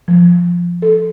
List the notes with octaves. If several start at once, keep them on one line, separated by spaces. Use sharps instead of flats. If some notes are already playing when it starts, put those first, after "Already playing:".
F3
A4